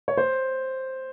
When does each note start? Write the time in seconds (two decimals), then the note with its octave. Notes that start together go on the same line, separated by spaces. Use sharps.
0.08 C#5
0.17 C5